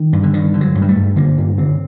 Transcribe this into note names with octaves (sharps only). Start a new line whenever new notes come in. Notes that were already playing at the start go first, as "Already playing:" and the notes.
Already playing: D#3
G2
D3
G2 D#3
D3
F#3
G2
G3
A3
G2
D3 A#3
G2
D3 C4